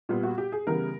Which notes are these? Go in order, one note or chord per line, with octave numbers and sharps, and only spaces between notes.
A#2 G3 B3 F4
F#4
G4
G#4
C#3 E3 G3 B3 A#4